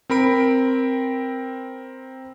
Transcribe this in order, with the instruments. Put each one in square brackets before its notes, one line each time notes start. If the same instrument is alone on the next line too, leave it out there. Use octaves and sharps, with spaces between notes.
[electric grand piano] C4 A#4 B5 D7